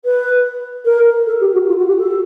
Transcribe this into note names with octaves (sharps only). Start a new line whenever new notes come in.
B4
A#4
A4
G4
F#4
F4
F#4
G4
A4